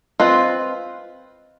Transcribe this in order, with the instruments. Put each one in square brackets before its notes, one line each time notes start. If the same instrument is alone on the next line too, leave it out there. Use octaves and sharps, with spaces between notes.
[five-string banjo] C4 F4 B4 [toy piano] D#5